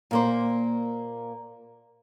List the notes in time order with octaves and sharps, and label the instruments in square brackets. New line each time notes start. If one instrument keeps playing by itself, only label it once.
[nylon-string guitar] A#2 A#3 C5